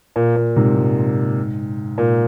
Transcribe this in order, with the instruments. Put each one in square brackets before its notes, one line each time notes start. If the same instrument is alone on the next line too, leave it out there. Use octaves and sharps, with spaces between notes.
[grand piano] A#2
A#2
G#2 C3
G#2
A#2